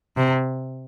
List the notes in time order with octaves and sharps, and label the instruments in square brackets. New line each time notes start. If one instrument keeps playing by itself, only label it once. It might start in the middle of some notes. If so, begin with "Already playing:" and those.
[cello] C3